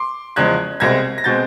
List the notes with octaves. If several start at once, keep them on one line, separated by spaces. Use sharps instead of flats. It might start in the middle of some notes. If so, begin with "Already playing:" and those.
Already playing: C6 D6
E2 C#3 F3 G#3 F#6 G#6
C2 B2 G#3 C4 G#6 A#6
A#6
B2 G#3 C4 G6 A6